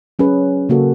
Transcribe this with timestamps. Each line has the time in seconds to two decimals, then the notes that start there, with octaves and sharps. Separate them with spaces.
0.19 F#3 C#4 G#4 B4
0.69 C#3 A#3 F#4 A4